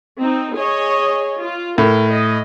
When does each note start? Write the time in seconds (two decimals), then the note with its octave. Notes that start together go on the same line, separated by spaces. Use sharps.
0.18 C4 D#4
0.54 G#4 C#5 D#5
1.39 F4
1.78 A2 A#4
2.10 D#5